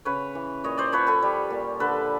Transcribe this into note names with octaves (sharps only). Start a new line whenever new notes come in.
C#3 B4 C#5
E3
A#2 C#5 D#5
C5 D5
F3 B4 C#5
A4 B4
G3
A#2
D3 A4 B4